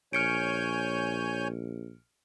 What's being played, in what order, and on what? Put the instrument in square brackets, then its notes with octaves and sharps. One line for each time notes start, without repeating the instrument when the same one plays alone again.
[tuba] A#1 [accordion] C#5 G#5 G6 [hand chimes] F6 C#7 D7